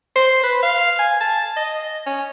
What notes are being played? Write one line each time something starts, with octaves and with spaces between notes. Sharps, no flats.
C5
B4
F5
G#5
A5
D#5
C#4